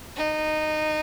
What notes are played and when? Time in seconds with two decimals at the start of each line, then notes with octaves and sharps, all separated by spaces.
0.16 D#4